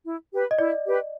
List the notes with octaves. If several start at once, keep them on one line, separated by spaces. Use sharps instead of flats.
E4
G4 B4
D#5
E4 D5
G4 B4